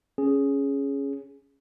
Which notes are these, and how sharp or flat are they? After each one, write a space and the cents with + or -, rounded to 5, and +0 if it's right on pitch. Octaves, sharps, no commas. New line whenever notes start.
C#4 +0 G#4 +0